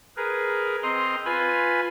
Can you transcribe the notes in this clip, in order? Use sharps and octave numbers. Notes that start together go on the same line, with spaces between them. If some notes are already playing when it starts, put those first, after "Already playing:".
G#4 A#4 B4
C4 D#5 A#5 C6
F4 B4 G#5 B5